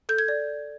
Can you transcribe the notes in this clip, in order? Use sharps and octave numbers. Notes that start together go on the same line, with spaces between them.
A4 G6
G#6
D5